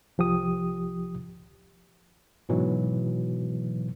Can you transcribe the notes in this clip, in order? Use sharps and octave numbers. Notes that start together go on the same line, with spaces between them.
C2 F3 G4 D#6
G#2 B2 E3 F#3